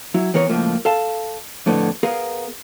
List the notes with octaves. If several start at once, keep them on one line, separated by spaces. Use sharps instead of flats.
F#3 E4
E3 B3 A#4 C#5
C#2 A2 F3 A#3
A4 F5 A5
F2 A2 D3 B3
B3 G#4 A#4 F5